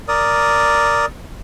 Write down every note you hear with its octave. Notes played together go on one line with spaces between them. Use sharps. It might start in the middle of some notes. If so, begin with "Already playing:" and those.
A#4 D5 D#6